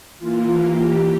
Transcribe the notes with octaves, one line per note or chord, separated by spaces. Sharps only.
E3 A#3 F4
G4